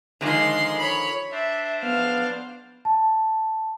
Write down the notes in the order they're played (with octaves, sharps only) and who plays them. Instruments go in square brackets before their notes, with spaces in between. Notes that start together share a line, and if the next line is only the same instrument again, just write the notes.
[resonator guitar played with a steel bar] D3 D#3 F3 [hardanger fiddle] G#3 C6
[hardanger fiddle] C#5 B5
[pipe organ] D4 C5 [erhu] E5
[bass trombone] B3 [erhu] F5
[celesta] A5